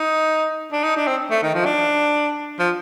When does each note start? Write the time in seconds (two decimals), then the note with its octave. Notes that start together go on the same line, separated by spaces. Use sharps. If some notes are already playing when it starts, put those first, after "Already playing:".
Already playing: D#4
0.72 D4
0.84 D#4
0.97 D4
1.08 C4
1.31 A3
1.43 D#3
1.54 F3
1.66 D4
2.60 F3